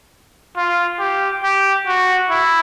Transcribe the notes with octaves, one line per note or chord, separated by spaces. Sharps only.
F4
G4
G4
F#4
E4